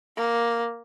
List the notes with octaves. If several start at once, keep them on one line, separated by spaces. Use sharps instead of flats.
A#3